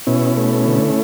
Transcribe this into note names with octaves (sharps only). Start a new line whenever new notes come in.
B2 C#4 E4
A3
D3